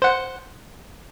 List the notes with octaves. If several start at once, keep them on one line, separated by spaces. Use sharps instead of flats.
C5 F#5